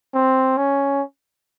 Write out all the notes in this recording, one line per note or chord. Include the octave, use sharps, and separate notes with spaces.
C4
C#4